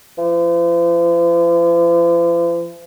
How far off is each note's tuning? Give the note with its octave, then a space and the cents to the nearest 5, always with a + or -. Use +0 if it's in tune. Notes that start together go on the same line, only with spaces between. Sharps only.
F3 -45